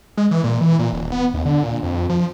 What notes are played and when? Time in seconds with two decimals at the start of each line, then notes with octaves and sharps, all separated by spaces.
0.17 G#3
0.31 E3
0.44 A#2
0.61 E3
0.79 A#2
0.93 D#1
1.12 B3
1.34 D#2
1.45 D3
1.63 A#2
1.83 F2
2.10 F3